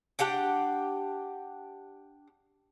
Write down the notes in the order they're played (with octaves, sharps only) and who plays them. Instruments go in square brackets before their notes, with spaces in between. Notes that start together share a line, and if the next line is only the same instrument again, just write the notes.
[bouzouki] D4 G4 F#5 G5